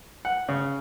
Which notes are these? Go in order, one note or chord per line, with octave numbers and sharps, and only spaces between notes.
F#5
C#3